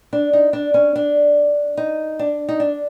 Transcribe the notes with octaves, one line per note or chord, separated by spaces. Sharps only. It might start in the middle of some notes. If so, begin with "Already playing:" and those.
D4
D#4
D4
C#4
D4
D#4
D4
D#4
D4